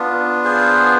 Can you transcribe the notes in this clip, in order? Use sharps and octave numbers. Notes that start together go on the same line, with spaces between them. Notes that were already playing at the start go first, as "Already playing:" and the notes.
Already playing: B3 D4 F4
G#4 C5